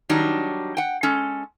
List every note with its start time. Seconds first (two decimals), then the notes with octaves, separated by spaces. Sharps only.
0.09 D#3 F#3 G3 D4 D#4
0.77 F#5 G5
1.03 G#3 C#4 A4